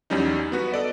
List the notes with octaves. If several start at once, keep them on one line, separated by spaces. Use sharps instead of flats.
E2 F#3 G3 C#4 D#4
B3 F#4 B4
A4 D5 D#5